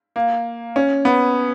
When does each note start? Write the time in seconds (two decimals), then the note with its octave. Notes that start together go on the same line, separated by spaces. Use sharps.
0.16 A#3
0.76 C#4
1.05 B3